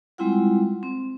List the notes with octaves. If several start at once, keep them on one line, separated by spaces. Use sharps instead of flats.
G3 G#3 C4 E4 F4 F#5
C4